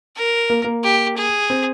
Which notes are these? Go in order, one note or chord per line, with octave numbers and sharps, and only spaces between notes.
A#4
A#3
A#3
G4
G#4
C4